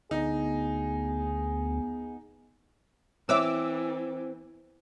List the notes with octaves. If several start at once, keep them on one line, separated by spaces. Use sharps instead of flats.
D2 B3 D#4 G#4
E3 C4 B4 C#5 E5 D6 E6